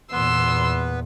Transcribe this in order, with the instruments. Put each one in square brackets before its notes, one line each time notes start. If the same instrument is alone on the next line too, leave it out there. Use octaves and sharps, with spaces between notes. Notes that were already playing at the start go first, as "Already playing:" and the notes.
[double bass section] E2 A#2 [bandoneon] B3 B4 [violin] C6 E6